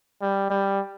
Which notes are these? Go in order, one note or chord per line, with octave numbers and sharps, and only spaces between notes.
G3
G3